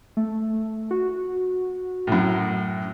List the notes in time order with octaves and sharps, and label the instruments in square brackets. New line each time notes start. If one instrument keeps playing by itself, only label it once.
[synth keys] A3
F#4
[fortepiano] F#2 A2